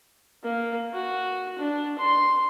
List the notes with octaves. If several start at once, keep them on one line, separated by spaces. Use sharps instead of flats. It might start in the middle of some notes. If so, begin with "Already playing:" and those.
A#3
F#4
D4
C6